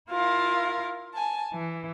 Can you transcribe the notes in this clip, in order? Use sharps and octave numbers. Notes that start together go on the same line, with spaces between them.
E4 F4 A#4 F5
G#5 A5
E3